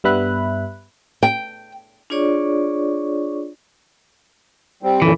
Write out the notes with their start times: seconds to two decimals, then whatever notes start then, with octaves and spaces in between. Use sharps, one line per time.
0.04 G2 G3 B3 E5 B5 F#6
1.23 G5
2.10 D4 F4 G#4 C#5 D5 C#6
4.83 G3 C4
5.02 F#2 A#2 D3 E3